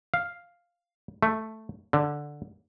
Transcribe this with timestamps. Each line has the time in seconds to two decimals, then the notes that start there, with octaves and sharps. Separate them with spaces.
0.14 F5
1.23 A3
1.93 D3